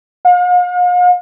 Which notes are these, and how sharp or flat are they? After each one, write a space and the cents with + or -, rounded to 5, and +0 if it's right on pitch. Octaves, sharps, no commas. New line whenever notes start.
F5 +45